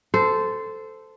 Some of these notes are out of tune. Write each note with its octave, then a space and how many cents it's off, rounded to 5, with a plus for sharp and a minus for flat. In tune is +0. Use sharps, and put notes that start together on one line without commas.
A4 +0 C5 -15